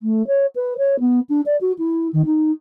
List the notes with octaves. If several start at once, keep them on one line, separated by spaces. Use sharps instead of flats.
A3
C#5
B4
C#5
B3
D4
D5
F#4
E4
D#3
D#4